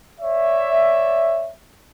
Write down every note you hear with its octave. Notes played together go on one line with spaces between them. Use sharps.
C#5 D5 E5